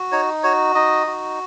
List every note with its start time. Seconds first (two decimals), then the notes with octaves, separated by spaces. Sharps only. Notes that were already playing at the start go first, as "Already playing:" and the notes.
Already playing: F#4
0.12 D#4 C#5
0.43 F#4 C#5
0.75 D#4 D#5
1.07 F#4